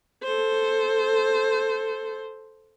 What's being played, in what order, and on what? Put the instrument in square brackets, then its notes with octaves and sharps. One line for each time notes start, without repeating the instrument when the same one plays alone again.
[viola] A4 C5